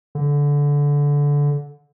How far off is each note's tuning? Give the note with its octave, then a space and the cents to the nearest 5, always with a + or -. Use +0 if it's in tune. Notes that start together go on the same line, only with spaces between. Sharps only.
D3 -20